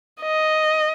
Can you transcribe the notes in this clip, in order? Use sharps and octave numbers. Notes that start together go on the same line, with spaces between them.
D#5